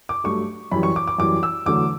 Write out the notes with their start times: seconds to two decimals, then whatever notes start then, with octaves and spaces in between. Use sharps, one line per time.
0.09 D6
0.24 G2 F#3 A3 C#6
0.71 F#2 E3 G3 B5
0.83 C#6
0.96 D6
1.07 D6
1.18 F#2 E3 G3 D6
1.43 E6
1.66 E2 D3 F#3 A3 D6